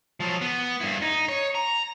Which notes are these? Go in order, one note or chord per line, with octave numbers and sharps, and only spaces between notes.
F3 F#3
B3
G2 E4
D#4
C#5
A#5